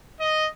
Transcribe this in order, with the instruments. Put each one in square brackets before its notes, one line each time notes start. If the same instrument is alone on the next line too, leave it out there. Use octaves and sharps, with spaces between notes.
[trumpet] D#5